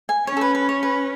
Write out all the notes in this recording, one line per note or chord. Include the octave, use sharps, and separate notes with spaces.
G#5
C#4 C#5
A4
B4
B4
C#5
B4